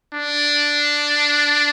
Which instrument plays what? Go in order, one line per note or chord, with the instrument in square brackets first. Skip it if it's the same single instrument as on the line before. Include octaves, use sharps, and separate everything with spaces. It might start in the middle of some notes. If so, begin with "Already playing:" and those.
[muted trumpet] D4